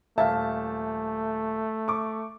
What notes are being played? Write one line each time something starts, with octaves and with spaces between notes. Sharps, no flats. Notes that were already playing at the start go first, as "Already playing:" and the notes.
D#1 A3 E5 F5 A5
C#6 D6